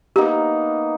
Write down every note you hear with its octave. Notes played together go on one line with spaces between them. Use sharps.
A#3 B3 D#4 G4